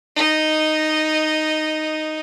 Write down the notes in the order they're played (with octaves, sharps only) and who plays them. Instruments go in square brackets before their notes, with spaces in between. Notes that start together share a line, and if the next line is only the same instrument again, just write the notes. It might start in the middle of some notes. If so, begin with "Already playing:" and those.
[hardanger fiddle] D#4 D#5